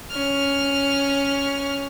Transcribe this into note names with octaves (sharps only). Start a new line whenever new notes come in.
C#4 F6